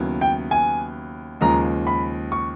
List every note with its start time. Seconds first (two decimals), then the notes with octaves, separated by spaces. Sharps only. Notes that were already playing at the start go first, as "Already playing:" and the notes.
Already playing: D#2 C#3 F#3 B3 E4
0.21 G5
0.51 G#5
1.41 D#2 C#3 F3 G#3 A#5
1.87 B5
2.32 C#6